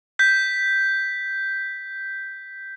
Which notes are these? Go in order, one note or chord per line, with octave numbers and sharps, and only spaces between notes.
G6 B6